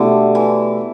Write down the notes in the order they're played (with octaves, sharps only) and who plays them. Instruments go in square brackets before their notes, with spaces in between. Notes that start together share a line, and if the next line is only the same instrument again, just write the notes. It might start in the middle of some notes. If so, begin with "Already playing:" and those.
Already playing: [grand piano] B2 A3 E4 G4 [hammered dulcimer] D3
[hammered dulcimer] E3